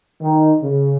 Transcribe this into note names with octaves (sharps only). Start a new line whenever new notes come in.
D#3
C#3